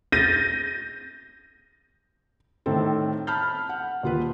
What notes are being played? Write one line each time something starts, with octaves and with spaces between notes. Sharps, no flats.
G6 A6 A#6 D#7
A2 D#3 C4 A4
A5 B5 F6 G6
F#5
D#1 F4 B4